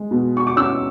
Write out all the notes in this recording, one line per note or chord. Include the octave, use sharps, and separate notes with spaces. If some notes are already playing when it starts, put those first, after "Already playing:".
Already playing: G#3
B2
C#6
D6
C#4 E6